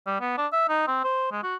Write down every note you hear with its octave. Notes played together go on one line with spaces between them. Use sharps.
G3
B3
D4
E5
D#4
C4
C5
G#3
F#4